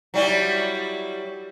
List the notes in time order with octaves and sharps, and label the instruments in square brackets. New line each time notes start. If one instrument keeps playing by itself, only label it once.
[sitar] F#3 G3 E4